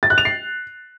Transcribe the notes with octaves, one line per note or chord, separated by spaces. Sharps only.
A6
F#6
F7
C7